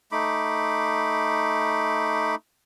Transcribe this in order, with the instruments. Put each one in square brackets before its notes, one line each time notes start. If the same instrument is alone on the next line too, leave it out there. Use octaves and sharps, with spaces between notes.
[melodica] A3 D#4 B5 D6